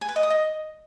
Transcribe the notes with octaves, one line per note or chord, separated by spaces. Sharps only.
G#5
B4
D#5
D#6
D#5